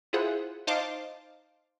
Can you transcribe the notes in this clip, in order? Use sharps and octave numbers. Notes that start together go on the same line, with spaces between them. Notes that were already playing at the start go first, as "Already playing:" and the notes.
E4 F4 G#4 C5 F#5
D#4 C5 F5 A5 C6 D6